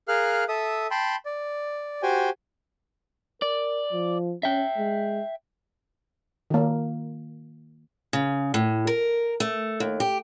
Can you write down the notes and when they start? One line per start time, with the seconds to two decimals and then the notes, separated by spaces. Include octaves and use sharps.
0.08 G#4 A#4 F5 F6 F#6
0.49 A4 E5 D#6
0.91 G5 A5 B5 C6
1.26 D5
2.03 F#4 G4 C5 G5 G#5
3.42 A#4 D5
3.93 F3
4.43 C#4 E5 G5
4.78 G#3
6.50 D#3 A#3
8.13 C#3
8.54 A2
8.87 A#4
9.40 A3
9.80 D#2
10.00 G4